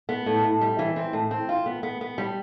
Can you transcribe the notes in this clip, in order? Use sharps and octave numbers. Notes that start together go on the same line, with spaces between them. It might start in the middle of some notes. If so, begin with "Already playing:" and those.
B3
A2
A2
G3
E3
C4
A2
C4
F4
B3
B3
B3
G3